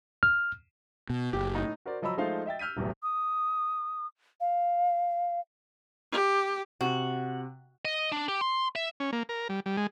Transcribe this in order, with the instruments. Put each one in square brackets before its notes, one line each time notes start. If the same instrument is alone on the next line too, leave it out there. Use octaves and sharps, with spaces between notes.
[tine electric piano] F6
[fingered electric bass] B2
[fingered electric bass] F#1 [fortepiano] G4
[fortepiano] A2 D#4
[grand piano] F#4 A#4 C5 D5
F3 F#3 D#5 A#5 B5 E6
F3 G#3 A3 D#4 C5 F5
D#5 E5 G5 A6
E6 F6 G6 B6 D#7
D#1 B1 E2 A2
[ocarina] D#6
F5
[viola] G4
[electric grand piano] C3 [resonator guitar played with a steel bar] F#4
[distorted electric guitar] D#5
D4
G4
C6
E5
[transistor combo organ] C#4
A#3
A#4
G3
G3
G#3